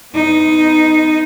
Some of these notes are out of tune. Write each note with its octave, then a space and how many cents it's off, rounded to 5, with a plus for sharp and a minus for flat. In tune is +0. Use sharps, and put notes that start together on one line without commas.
B3 +25 D#4 +0